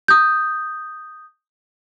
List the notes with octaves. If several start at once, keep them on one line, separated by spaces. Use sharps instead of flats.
D#6 G6